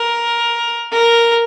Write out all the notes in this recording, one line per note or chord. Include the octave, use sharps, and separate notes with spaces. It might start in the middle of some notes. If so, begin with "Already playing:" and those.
Already playing: A#4
A#4